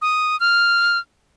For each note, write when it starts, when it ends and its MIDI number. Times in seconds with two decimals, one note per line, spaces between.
0.02 0.39 87
0.40 0.98 89